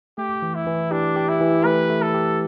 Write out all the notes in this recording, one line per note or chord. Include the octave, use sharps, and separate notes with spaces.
A3 G4
E3
E4
E3
D4 G4
G4
E4
E3
A3 B4
A3
A4
G4